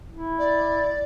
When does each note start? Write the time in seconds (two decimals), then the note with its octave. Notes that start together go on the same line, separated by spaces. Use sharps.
0.11 E4
0.39 D5